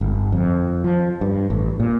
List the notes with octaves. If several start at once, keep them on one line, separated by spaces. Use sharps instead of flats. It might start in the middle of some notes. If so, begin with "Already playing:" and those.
G1
F2
F3
G2
A1
A#2